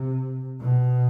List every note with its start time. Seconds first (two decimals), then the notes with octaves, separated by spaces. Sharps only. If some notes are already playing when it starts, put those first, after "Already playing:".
Already playing: C3
0.61 B2